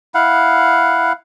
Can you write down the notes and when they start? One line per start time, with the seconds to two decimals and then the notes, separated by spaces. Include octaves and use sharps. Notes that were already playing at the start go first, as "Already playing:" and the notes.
0.14 E4 F5 F#5